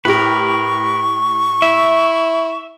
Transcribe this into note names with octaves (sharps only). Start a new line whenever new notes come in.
A2 G4 A#4 B4 C#6
E4 E5